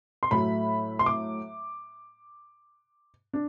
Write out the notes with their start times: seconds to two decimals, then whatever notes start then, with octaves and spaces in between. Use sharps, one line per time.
0.23 C6
0.31 A2 F#3 A3 E4 B5
0.99 C6
1.06 D6
3.34 D4